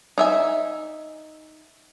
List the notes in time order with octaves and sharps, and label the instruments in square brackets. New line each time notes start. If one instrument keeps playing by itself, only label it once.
[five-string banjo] D#4 E5 G#5